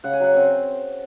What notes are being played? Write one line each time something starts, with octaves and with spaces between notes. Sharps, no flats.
C#3 F#5
G#5
F#3 F#5
C4 G#5